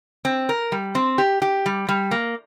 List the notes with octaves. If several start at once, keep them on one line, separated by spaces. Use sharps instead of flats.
C4
A#4
G3
C4
G4
G4
G3
G3
A#3